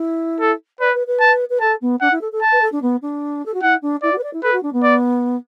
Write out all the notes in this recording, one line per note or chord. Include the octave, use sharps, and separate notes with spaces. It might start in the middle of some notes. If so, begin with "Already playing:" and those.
Already playing: E4
A4
B4 D5
B4
B4
A5
B4
A4 A5
B3
D4 F#5
E4
A4
A4
A5
B4
A4
D4
B3
D4
A4
F#4
E4 F#5
D4
E4 D5
F#4
B4
D5
E4
A4 B4
F#4
D4
B3
D5